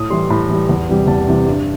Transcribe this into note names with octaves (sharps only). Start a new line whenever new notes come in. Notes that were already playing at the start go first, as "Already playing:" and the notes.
Already playing: A2 D#6
E3 G3 C6
A2 B5
E3 G3
E2
C3 E3 G3
E2 A5
C3 E3 G3
G2